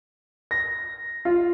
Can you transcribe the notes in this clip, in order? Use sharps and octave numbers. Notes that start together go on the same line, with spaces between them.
A#6
F4